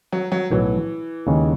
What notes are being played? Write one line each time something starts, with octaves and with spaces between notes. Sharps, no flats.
F#3
F#3
B1 A2 E3 F#3
D#2 C#3 G#3